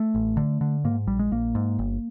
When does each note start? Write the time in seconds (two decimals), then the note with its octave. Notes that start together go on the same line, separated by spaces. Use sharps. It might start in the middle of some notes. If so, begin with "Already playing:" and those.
Already playing: A3
0.15 A1
0.37 D3
0.61 D3
0.84 G#2 A#3
1.07 A#1 G3
1.19 G#3
1.31 A#1 A#3
1.55 G#2
1.79 G1